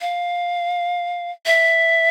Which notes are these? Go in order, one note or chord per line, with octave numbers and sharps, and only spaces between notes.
F5
E5